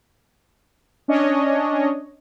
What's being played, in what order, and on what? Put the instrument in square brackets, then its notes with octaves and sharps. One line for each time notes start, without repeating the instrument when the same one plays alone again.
[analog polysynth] C#4 D4 C#5 D#5